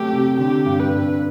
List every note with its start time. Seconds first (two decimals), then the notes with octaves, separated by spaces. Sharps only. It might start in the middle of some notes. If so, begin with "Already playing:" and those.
Already playing: C3 F#3 A3 G4
0.13 C3
0.39 D3 G4
0.66 G2
0.80 B4
0.93 G2